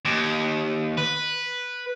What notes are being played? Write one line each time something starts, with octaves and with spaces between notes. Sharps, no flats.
D#2
B4